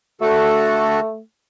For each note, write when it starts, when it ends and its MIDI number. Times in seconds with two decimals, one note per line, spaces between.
0.21 1.00 50
0.21 1.19 57
0.21 1.00 66
0.21 1.00 69